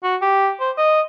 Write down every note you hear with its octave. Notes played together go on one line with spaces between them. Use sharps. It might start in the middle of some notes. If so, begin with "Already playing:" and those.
F#4
G4
C5
D#5